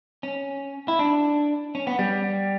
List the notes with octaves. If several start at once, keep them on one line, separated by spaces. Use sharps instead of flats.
C#4
E4
D4
C#4
B3
G3